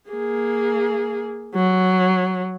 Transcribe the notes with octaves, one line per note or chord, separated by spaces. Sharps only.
A#3 G#4
F#3